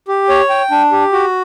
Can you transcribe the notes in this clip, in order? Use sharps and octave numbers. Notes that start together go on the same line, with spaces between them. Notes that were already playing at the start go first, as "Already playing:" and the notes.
G4
C#5
G5
D4
G4
F#4